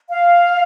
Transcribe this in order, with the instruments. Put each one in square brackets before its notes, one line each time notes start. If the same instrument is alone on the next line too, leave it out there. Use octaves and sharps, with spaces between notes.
[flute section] F5